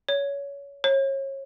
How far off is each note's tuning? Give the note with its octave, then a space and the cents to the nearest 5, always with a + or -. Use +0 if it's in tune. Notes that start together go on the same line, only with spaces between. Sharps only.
C#5 +25
C#5 -30